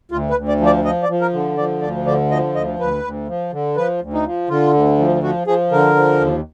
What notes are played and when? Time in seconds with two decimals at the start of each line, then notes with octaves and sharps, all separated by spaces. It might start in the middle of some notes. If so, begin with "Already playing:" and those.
0.12 D2 F4
0.30 B4
0.36 D2
0.48 D5
0.60 F3
0.66 D5
0.85 F3 D#5
1.03 D5
1.09 F3
1.21 A#4
1.33 D3
1.58 F3 D5
1.82 D2 D5
2.06 D3 D5
2.31 F3 D#5
2.55 D2 D#5
2.79 D2 B4
3.04 D2
3.28 F3
3.53 D3
3.76 F3 B4
4.01 D2
4.13 D#4
4.25 F3
4.49 D3 F4
4.74 D2
4.98 F3
5.23 F3 F#4
5.47 F3 G#4
5.72 D3 A#4
5.96 F3
6.20 D#2